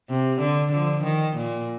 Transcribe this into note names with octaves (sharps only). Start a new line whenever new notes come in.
C3
D3
D3 F3
D#3
A#2